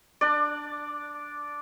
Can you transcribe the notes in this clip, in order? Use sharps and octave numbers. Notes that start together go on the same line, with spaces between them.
D4 D5